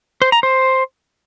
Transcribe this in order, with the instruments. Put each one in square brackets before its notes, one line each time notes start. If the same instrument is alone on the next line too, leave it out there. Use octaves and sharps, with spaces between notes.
[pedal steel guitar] C5
A#5
C5